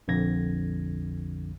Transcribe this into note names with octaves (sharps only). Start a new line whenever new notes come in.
A#1 F2 D3 G#6 A#6